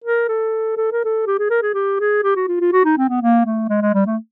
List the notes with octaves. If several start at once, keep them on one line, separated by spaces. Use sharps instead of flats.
A#4
A4
A4
A#4
A4
G4
G#4
A#4
G#4
G4
G#4
G4
F#4
F4
F4
F#4
D#4
C4
B3
A#3
A3
G#3
G#3
G3
A3